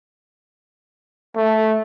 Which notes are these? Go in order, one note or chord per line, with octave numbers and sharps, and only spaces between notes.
A3